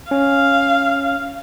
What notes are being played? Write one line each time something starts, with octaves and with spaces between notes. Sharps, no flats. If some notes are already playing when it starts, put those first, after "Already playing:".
C#4 F5